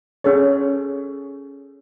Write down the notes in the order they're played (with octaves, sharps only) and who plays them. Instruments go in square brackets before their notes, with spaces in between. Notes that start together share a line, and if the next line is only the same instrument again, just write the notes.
[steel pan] C#4 G#4 A4 C#5